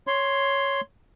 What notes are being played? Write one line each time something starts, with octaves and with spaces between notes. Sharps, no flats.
C#5 C6